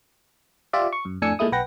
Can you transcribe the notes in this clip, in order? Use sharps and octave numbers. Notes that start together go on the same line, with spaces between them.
F4 G4 D5 E5
C#6
F#2
F2 A2 D4 G#5 E6 C#7
A#2 G#3 A3 E4 D#6
B1 B4 F#5 G5 A#6